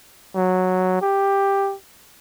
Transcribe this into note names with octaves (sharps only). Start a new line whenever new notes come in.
F#3
G4